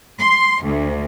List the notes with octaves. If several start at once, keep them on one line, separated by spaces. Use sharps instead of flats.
C6
D2